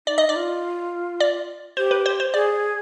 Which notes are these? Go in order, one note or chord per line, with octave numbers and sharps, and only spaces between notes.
D#4 D5
D#5
D#4 D5
F4
D5
G4 C5
B4
C5
C5
G#4 D5